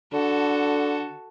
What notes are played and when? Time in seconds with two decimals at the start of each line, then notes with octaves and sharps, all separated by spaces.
0.13 D3 F#4 A4